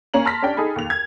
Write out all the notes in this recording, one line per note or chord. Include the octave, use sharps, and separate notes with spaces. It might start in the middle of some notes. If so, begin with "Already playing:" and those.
A#3 C#4 A#5 F#7
A5 C6 F6 A#6 B6
C#4 D4 G4 G5
D#4 G#4 A4 G#5 B5
D#2 F7
G#6